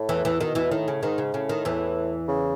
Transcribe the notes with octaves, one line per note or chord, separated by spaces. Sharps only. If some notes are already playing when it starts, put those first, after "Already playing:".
Already playing: A2
E2 E3
E2 E3
B2 D#3
E2 E3
A2 D#3
C#3
G#2 D#3
C#3
A2 C#3
D#3
E2 E3
C#3